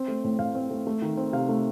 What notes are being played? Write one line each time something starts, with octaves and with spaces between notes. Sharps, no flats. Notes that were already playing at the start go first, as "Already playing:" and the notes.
Already playing: C4
A3
A2
A2 F5
C4
A3
A3
D#3
C4
C3 F5
A3